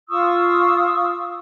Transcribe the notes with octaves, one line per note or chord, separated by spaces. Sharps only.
F4 C#6 D#6 E6